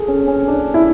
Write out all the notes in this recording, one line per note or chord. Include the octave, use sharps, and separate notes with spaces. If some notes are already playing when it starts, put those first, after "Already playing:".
Already playing: G#4 A4
C#4
C#4
D4
E4